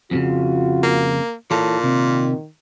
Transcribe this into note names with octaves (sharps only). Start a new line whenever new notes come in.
F2 A#2 C#3 F4 F#4
A#3
A#2 E3 A4 C#5
C3 D#3